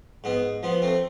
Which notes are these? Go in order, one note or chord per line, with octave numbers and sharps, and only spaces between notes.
G#2 B3
F3 B3
A3 C4